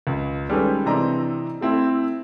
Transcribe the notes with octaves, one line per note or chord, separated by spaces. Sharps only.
C#2
D#3 G3 G#3 C#4 A4 B4
C3 E3 C4 D4 D#5 A#5
A3 C4 E4